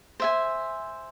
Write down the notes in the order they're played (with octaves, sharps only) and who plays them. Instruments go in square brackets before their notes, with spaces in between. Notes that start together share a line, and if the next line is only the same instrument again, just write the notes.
[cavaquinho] C5 E5 G#5